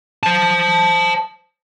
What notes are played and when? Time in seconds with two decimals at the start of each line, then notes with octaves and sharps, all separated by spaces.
0.23 C5 A5